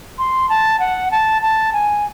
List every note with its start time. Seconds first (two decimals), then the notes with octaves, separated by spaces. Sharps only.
0.18 C6
0.49 A5
0.80 F#5
1.11 A5
1.42 A5
1.73 G#5